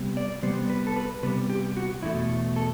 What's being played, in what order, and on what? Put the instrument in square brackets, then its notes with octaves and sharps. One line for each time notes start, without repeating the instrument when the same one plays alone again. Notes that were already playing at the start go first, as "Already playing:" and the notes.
Already playing: [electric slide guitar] C3 G3 B3
D5
C3 G3 B3 C5
B4
A4
B4
C3 G3 B3 B4
G4
F#4
E2 B2 A3 E4
A4